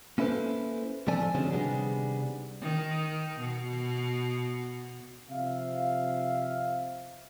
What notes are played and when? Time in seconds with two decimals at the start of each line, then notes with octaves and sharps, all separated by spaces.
0.18 A#3 C#4 E4 A4 B4 C5
1.07 A2 F3 C4 A4 D5 G#5
1.35 D3 F3 F#3 G#3 C4 C#4
1.51 C3 D#3 G3 B3 D4 G#4
2.61 D#3
3.39 B2
5.30 C3 F3 E5 F5